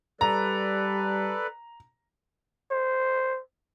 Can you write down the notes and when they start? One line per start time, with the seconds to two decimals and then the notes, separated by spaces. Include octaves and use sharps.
0.21 G3 A4 B4 D5 A#5
2.71 C5